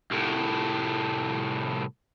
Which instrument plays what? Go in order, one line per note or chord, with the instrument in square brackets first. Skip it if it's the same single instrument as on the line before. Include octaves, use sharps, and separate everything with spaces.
[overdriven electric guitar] C2 A2